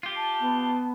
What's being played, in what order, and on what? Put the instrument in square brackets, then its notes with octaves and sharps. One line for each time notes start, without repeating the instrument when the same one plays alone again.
[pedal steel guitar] F4 G4
[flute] A5
[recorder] B3